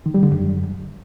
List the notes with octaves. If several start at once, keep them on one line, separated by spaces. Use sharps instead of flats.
D#3
G3
D3
F#2